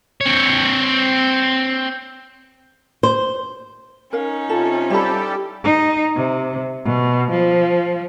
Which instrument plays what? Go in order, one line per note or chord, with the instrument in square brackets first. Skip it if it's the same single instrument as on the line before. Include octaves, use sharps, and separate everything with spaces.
[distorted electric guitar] C4 C#5
[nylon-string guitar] C5
[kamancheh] C#4 D#4 [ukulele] A#4 F5
[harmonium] C3 F4 [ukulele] A4
[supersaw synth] G3 G4 A4 [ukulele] E4 B5
[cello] D#4
C3
B2
F3